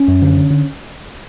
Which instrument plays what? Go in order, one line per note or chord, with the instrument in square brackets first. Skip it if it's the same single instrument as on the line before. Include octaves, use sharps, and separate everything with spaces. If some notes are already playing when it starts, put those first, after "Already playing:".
Already playing: [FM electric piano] C#4
F#2
D3
D3
D3